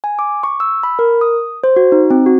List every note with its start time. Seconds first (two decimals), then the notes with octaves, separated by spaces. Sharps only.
0.04 G#5
0.19 D6
0.43 C#6
0.60 E6
0.83 B5
0.99 A#4
1.21 D#6
1.64 C5
1.76 F#4
1.92 D#4
2.10 C4
2.26 F#4